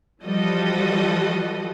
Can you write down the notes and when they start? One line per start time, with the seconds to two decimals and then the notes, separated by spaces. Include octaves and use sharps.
0.23 E3 F3 G3 F#4 A4 D#5